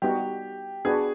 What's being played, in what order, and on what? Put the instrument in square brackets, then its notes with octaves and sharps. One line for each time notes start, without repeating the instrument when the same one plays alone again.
[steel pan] G3 B3 D#4 F#4 [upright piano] G4
[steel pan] B3 D4 F#4 B4 [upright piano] G#4